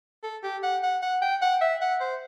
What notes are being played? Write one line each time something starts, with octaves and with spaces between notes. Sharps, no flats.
A4
G4
F#5
F#5
F#5
G5
F#5
E5
F#5
C5